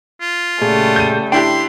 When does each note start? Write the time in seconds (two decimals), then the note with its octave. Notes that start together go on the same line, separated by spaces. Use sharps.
0.21 F4
0.62 A#2 C#3 G3 A3 G#4
0.96 G6 D#7
1.32 D4 E4 G4 G5 C6